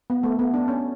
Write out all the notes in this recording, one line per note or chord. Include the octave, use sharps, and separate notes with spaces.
B3
A3
B3
D4
C#4